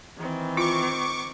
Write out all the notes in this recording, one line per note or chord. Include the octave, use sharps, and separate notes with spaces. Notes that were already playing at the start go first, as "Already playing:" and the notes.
D#3 E3 C4
F4 C#6 D6